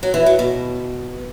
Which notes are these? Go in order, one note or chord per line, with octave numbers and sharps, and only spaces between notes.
F#3
E3
F#3
B2